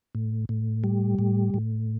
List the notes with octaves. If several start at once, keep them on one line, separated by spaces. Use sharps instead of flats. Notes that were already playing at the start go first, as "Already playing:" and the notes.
A2
A2
G3
A2
A2